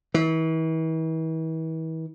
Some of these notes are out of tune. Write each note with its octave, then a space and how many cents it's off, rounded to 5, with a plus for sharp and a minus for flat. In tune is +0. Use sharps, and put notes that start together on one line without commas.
E3 -40